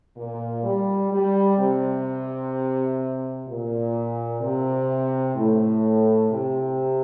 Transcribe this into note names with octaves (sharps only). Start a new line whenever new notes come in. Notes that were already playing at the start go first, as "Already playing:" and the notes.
A#2
G3
G3
C3
A#2
C3
A2
C3